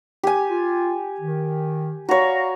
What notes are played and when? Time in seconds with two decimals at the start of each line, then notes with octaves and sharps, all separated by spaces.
0.23 G4 G#5
0.49 F4
1.20 D#3
2.09 F#4 C#5 D5 F5 A#5